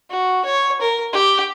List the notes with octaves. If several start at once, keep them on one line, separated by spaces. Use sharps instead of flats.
F#4
C#5
A#4
G4